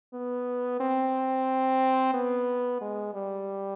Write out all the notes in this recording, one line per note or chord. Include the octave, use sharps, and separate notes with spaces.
B3
C4
B3
G#3
G3